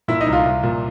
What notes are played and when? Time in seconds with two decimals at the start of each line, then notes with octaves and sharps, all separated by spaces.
0.08 A#2 E4 E5
0.21 D#4 D#5
0.27 C2
0.32 F4 F5
0.46 C2
0.63 A#2